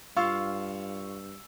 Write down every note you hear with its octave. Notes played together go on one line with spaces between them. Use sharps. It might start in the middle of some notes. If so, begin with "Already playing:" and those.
G2 F4 F5 C#6 E6